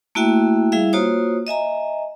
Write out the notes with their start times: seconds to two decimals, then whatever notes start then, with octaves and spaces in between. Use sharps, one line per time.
0.15 A3 A#3 E4 F#4 E5 G5
0.72 G3 E4 G#4 E5 F5
0.93 A#3 F4 F#4 C5 C#5 D#6
1.47 D#5 E5 G#5 A#5